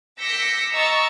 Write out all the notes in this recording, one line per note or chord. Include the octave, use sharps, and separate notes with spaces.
D6 E6 G6 A#6 B6 C#7
D#5 A#5 C#6 E6 A6